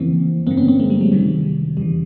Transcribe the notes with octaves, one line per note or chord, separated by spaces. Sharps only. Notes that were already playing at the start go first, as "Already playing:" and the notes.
Already playing: F2 C#3 E3 A#3 C4
G2 D3 A#3 C4
B3 C#4
A#3 C4
G#3 A#3
G3 A3
F#3 G#3
F2 C3 D#3 G3
E2 C#3 E3 G3